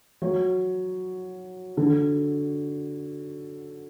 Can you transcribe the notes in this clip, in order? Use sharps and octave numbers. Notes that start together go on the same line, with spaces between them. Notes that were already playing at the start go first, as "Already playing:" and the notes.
F#3
D3